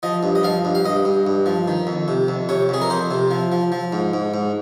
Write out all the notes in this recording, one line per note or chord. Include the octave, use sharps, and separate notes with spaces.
F3 D#5
G2
D#5
F3 F5
G2
F5
G2 D#5
G2
G2
F3
D#3
F2
C3
F2
C3 C#5
F2 G#4
A#4
F2 C5
C3
F3
F3
F3
G#2
G#2
G#2